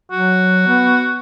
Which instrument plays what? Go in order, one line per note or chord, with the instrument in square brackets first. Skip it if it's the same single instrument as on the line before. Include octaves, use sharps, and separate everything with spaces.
[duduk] F#3 [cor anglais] F#4
[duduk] B3